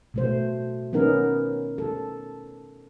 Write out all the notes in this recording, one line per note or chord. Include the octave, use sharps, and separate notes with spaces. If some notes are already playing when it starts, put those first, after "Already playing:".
B2 A3 C5
B3 C#4 D#4 A#4
A4